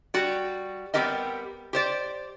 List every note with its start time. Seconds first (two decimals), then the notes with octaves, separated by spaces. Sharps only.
0.14 G3 F#4 D5
0.94 G3 B3 C4 G4 A#4 D#5
1.73 G4 C5 D5